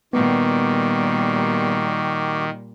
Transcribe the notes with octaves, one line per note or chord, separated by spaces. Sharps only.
A#2 D#3 G3 B3 F#4 G4